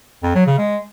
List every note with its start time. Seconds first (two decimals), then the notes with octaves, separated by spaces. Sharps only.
0.23 F2
0.35 F#3
0.47 C#3
0.58 G#3